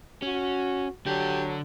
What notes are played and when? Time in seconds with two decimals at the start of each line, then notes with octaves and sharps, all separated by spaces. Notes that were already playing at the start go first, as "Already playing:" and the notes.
0.22 C#4 F#4
1.06 D3 F#3 G4 A4